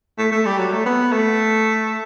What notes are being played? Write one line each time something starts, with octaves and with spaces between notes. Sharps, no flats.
A3
A3
G3
F#3
A3
B3
A3